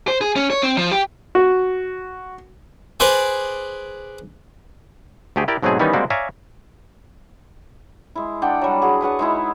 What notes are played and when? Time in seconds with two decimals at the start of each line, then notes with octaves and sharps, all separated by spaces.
0.08 C5
0.21 G#4
0.36 C#4
0.50 C#5
0.63 C4
0.77 F3
0.92 G4
1.35 F#4
3.00 G#4 B4 C5 D5 G#5
5.36 D2 A3 G4 G#4
5.48 E4 G4 A#4 D5
5.63 G#2 B2 F#3 A3 C4 G#4
5.79 D#3 E3 G3 B3 C#4 D#4
5.93 G3 G#3 A#3 C4 F#4 G4
6.10 C#5 D5 E5 F5 G#5 A#5
8.15 G#3 E4
8.42 D4 D5 F#5 G5
8.61 F#3 G3
8.82 F#4 G#4
9.01 B4 C#5 F#5 A5
9.19 G#3 D#4 E4